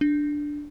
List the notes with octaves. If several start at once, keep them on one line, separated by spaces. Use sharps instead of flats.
D4